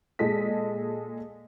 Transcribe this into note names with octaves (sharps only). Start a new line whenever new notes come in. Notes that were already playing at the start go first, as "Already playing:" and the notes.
A#2 G#3 A4 D#5 B6